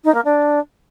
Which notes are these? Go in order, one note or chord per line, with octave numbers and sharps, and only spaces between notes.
D#4
A#3
D4